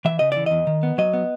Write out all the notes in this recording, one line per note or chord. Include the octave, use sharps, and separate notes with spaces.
E3 E5
C#3 D#5
E3 D5
E2 D#5
D#3
B3
F#3 D#5
B3